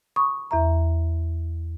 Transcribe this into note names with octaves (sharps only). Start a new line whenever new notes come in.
B5 C#6 D#6
E2 E5 A#5